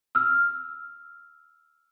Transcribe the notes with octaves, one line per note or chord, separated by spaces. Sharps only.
E6 F6